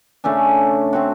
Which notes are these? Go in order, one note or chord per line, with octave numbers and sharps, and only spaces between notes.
C#3 A3 C#4 D4
A3 C4 F#4